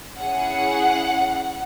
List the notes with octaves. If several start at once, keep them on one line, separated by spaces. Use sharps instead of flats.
C#4 E4 G#4 F#5